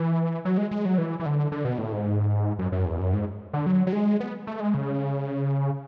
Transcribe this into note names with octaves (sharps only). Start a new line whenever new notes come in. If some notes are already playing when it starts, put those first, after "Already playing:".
Already playing: E3
F#3
G#3
G#3
F#3
E3
E3
D3
D3
B2
A2
G#2
F#2
F#2
E2
F#2
G#2
D3
F#3
F#3
G#3
B3
A3
G#3
C#3